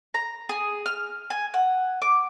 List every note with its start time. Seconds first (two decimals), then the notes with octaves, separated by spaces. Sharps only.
0.14 A#5
0.49 G#4
0.86 F6
1.30 G#5
1.54 F#5
2.02 D6